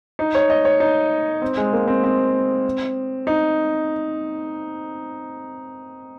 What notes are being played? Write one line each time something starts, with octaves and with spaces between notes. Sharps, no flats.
D#4
C#5
D#5
C#5
D#4
C4
G#3
A#3
C4
C4
D#4